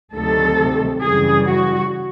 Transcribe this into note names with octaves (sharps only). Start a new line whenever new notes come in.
D2 C3 D#3 F#3 A4
F#2 C#3 E3 G3 G#4
F#4